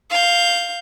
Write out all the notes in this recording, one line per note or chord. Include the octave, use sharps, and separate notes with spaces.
F5 G6